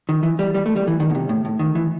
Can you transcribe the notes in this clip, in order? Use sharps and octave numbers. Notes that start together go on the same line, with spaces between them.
D#3
E3
G3
G3
A3
G3
E3
D#3
B2
C3
A2
A2
D#3
E3